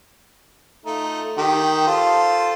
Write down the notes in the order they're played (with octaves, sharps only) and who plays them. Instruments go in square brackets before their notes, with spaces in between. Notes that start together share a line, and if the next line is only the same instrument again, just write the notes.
[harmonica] A3 D#4 F4
D#3 G4
F4 A4 C5